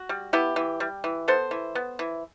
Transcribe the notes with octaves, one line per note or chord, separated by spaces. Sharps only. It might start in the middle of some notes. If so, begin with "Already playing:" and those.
Already playing: F#4
G3
B3 E4 G4
E3
G3
E3
B3 A4 C5
E3
B3
E3